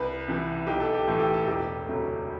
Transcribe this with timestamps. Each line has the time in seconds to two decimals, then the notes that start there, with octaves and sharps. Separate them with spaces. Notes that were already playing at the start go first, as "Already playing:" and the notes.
Already playing: C2 B4
0.28 C3 E3
0.67 B1 G4
0.80 A4
0.94 G4
1.08 A2 E3 A3 A4
1.20 G4
1.34 A4
1.47 E1 G4
1.86 D2 C3 F#3 A3